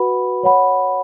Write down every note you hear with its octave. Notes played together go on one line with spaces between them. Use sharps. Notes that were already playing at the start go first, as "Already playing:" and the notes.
Already playing: F#4 B4 F#5 B5
C#5 F#5 B5